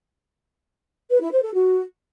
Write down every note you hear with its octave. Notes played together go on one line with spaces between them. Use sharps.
B4
E4
C5
A4
F#4